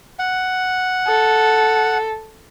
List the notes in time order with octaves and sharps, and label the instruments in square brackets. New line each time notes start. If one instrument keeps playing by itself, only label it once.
[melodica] F#5
[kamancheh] A4